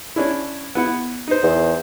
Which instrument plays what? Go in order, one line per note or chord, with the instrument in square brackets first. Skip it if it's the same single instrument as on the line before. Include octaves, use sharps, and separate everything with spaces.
[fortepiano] C#4 D4 E4
B3 E4 F#5
D#4 C5
[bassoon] E2